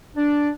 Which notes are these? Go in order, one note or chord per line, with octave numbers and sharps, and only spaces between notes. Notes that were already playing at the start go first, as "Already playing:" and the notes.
D4